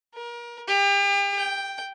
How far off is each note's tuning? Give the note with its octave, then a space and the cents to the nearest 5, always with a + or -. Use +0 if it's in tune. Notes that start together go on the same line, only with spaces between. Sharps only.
A#4 +35
G4 +35
G5 +0